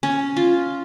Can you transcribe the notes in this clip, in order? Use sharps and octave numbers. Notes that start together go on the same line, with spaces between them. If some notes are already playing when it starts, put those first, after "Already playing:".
C#4
F4